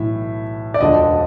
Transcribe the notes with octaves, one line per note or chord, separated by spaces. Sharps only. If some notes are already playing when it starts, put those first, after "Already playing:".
Already playing: B1 A2 E3 E5
D5
E1 D2 D3 F3 D#5